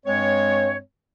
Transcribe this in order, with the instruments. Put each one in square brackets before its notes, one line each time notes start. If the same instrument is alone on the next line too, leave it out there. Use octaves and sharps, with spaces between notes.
[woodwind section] G2 G#3 C4 C#5